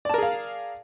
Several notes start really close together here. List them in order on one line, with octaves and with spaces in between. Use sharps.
D5 A5 A#4 G#4 F5